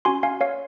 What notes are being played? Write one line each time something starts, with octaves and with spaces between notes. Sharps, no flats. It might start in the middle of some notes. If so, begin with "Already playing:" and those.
C#4 F#4 G#5 C6
F5 G#5
C#5 F5